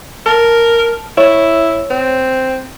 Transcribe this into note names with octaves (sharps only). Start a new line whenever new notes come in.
A#4 A5
E4 C#5
C4